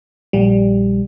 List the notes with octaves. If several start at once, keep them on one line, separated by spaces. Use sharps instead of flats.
A#1 G3